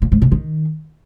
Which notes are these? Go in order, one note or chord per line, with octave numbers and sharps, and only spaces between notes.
A#2
G#2
B2
D#3